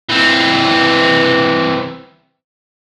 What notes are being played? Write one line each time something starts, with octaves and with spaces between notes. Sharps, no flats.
E3 C4